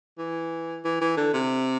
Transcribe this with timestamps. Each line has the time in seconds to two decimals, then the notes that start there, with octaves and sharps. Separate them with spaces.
0.18 E3
0.85 E3
1.01 E3
1.17 D3
1.33 C3